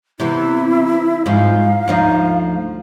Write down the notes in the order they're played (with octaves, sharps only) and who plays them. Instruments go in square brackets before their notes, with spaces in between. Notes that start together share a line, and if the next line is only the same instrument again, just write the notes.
[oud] C3 E3 B3 [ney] E4
[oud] G#2 F3 [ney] F5
[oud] D2 F3 D#4